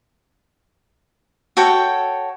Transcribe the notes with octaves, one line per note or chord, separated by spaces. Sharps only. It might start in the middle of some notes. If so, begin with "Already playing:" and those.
F#4 A4 C#5 G5